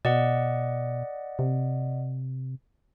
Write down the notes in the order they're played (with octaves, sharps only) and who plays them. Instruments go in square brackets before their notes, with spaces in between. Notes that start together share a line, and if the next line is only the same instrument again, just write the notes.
[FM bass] B2 [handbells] D5 D#5 F#5
[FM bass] C3